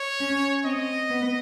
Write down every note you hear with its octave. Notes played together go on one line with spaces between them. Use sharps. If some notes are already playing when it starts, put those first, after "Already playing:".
Already playing: C#5
C#4
C4 D#5
B3